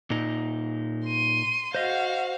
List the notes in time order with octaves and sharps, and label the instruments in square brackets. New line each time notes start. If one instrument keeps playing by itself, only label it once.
[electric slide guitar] A#2 D#4
[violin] C6 D#7
[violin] F#4 F5 [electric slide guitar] C5 D#5